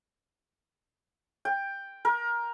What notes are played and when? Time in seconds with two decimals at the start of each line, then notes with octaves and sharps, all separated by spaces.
1.45 G5
2.05 A#4